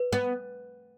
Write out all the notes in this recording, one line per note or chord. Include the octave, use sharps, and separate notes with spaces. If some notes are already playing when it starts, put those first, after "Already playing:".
Already playing: B4
B3